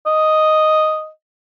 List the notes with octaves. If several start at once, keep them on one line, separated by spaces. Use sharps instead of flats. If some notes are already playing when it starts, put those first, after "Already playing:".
D#5